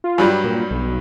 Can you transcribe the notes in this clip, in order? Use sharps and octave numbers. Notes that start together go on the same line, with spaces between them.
F4
G2 F#3 G3
A#2
B1